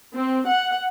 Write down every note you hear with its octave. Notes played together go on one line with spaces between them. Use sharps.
C4
F#5